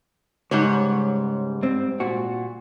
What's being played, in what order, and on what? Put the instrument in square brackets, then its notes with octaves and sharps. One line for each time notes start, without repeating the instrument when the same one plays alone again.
[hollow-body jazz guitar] C#2 [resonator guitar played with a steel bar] G#2 G3 C#5
[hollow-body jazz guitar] G2 C4
A#2 F#4